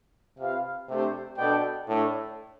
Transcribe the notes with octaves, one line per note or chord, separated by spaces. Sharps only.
C3 F4 B4 F5
C3 A3 D4 G4 C5
B2 B3 D4 A4 D5 G5
A2 A3 D4 A4